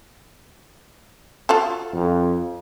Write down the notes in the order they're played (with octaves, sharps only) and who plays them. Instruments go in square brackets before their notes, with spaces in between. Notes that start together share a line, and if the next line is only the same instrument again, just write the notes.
[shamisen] F4 F#4 A4
[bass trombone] F2